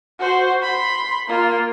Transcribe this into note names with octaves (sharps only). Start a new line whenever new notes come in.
F#4 C5
B5 C6
A#3 F4